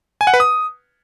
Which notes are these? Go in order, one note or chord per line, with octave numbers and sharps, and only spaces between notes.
G#5
F#5
B4
D#6